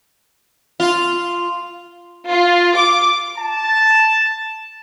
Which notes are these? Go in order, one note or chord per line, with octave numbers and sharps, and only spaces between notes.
F4
F4
D6
A5